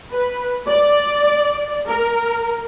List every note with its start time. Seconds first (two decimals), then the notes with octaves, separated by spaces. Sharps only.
0.11 B4
0.68 D5
1.87 A#4